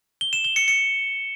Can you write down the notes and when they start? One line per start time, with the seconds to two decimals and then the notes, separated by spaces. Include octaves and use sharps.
0.21 G7
0.33 E7
0.44 G7
0.56 C#7
0.68 C#7